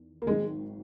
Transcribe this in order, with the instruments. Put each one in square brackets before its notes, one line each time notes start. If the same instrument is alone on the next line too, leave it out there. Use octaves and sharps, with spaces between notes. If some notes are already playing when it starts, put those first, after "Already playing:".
Already playing: [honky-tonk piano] E2 D#3
[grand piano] A#3
[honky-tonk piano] G#1 G#2 D#3 F#3 [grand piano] G#3